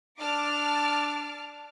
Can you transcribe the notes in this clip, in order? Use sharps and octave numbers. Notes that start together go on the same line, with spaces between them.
D4 A5 D6 F6